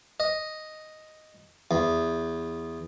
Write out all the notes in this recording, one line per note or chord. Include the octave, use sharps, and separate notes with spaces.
D#5
E2